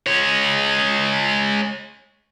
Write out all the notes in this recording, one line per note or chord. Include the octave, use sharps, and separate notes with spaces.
G#3 C#5